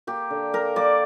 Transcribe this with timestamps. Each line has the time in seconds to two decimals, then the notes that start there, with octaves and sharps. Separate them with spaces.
0.07 A#3 G4
0.30 D3
0.53 A#3 A#4
0.76 A#3 D5